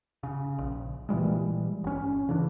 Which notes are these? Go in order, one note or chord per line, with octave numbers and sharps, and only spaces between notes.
C#3
A#1
A#2 E3 G3 G#3
G1 C#4
C#3 E3 D4